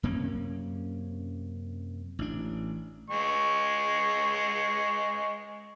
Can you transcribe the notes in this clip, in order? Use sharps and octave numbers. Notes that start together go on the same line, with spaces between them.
F#2 C3 A#3 C#4
A1 D4
G#3 C#6